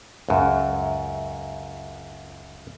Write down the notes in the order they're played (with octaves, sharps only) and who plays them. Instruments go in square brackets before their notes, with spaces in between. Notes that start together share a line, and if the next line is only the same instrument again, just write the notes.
[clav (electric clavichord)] C#2 F#2